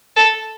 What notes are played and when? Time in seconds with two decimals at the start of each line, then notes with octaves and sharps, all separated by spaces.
0.16 A4